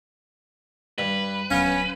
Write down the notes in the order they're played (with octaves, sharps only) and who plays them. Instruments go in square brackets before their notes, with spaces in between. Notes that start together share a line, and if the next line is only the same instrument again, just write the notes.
[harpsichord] G2 [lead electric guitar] B4
[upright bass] D1 F#3 [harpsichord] B3 F5 [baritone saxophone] C#4